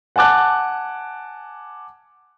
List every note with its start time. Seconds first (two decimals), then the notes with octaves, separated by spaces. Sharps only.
0.16 F#5 G#5 A5 D6 F#6